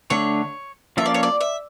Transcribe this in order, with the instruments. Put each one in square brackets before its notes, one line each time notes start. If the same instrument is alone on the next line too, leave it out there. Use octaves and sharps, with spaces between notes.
[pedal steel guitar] D3 A3 D4 [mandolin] C#5
[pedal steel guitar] F3 A#3 C#4 F4 A4 [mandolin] E5
[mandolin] D5
C#5
D5
E5